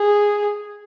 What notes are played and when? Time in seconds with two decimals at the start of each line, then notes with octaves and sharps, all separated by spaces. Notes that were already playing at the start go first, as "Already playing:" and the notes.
Already playing: G#4